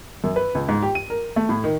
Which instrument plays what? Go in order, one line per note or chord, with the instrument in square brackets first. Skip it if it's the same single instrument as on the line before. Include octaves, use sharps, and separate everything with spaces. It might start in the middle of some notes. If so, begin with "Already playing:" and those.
[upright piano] F#2
B4
C#2
G#2
G4
D#7
A#4
A3
A2
D#3